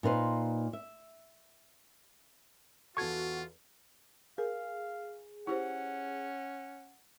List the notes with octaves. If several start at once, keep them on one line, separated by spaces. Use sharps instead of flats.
A#2 D#4 B4 C5
E5
E2 F4 F#4 A4 C#6 G#6
G#4 A#4 F5
C#4 E4 G4 C5 F#5